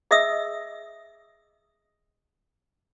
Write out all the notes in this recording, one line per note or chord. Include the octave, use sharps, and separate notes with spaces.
G#4 D#5 E5 D#6 E6